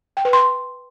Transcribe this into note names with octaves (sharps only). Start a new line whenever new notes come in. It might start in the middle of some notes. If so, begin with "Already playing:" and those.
G5
B4
C6